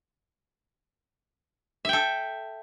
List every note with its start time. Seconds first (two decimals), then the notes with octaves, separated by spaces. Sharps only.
1.85 E5
1.89 G5
1.93 A4